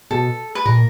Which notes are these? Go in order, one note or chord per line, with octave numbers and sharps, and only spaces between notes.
B2 A4
B4
A#2 A#4